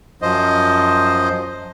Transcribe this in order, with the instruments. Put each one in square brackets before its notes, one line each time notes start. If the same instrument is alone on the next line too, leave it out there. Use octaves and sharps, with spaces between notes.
[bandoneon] F#2 F3 C5 D#5